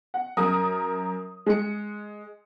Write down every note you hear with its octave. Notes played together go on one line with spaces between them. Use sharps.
F#5
F#2 A#4 D#6
G#3 C#7